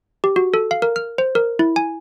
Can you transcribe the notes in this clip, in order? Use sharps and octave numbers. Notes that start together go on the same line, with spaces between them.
G4
F#4
A4
F5
A#4
F6
C5
A#4
E4
G#5